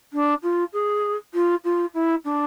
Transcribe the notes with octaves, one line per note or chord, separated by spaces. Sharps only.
D4
F4
G#4
F4
F4
E4
D4